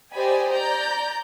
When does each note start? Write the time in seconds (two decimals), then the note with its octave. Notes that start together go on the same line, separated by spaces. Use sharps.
0.12 G4 C5 D5 D#5 G#5 B5
0.50 D5 A#5 G6